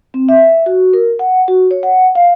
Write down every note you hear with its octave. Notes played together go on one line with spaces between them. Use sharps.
C4
E5
F#4
A#4
F#5
F#4
C#5
F#5
F5